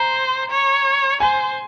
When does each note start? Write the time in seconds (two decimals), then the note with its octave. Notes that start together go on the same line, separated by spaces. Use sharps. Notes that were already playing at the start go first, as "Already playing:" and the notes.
Already playing: C5 A#5
0.51 C#5
1.20 C5 G#5